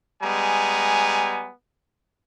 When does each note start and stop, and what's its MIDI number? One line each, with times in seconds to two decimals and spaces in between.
0.23 1.51 55
0.23 1.51 56
0.23 1.51 59
0.23 1.51 80
0.23 1.51 82